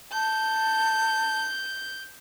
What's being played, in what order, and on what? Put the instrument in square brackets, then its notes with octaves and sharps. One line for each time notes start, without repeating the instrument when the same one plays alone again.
[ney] A5 [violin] G6